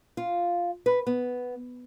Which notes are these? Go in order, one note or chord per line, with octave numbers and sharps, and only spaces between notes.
F4
B4
B3